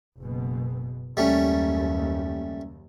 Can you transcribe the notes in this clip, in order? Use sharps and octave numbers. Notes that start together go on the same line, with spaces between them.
F#1 B2
F#1 D#2 G3 A3 C#4